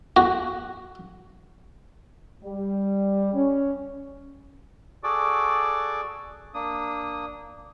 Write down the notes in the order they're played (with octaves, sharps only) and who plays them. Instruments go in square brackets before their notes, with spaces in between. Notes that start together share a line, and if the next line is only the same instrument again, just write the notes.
[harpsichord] F#4
[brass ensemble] G3
C#4
[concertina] F#4 G#4 A4 D5 D6
A#3 D4 D#6